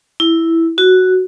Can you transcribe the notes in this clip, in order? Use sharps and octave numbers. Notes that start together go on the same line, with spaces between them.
E4
F#4